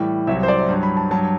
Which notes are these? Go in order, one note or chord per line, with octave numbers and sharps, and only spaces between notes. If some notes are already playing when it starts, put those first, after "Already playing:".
Already playing: A2 E3 G3
C2 C3 F#3 E5
C5
D5
G2 F#3
B5
A5
G2 F#3 A5